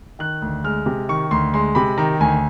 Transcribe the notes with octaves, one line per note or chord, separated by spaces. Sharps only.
D#3 F#6
D2
G#3 F6
C3
D#3 C#6
D2 C6
G#3 C6
C3 B5
D#3 A#5
D2 G#5